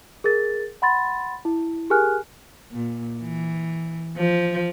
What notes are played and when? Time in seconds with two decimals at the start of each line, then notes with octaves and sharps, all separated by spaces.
0.24 G#4 A#4 A6
0.82 F#5 B5 C6 A6
1.45 E4
1.90 G4 G#4 A#4 G#5 F6 F#6
2.72 A#2
3.21 E3
4.16 F3